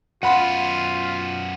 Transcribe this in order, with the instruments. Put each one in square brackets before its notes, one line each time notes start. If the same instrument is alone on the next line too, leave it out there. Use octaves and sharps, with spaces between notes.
[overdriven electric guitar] F#2 B3 [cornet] F4 [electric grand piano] F#5 B5 C6